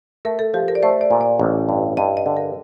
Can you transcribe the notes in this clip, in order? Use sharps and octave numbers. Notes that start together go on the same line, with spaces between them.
A3 A#4
A4
F3 G4
A#4
D5
A3 C5
D5
A#2
D5
A1
G2
G2 D#5
D#5
D3
A#4